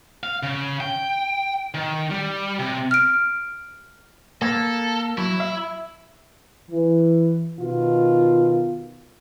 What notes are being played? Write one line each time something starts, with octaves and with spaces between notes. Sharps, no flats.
F5
C#3
G5
D#3
G3
C3
F6 D7
A#3 A4
F#3 E4
E5
E3
B2 D#3 F4